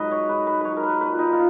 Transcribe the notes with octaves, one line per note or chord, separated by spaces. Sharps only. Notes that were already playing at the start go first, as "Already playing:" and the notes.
Already playing: G#2 F#3 B4 D#5
C#5
G#2 B4
B4
F#3 B4 C#5
A#4
B4
A#2 B4
D#4
F4